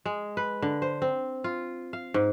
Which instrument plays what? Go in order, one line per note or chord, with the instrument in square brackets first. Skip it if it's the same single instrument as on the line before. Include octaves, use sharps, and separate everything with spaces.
[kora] G#3
B4
D3
C5
C4
F4
F5
G#2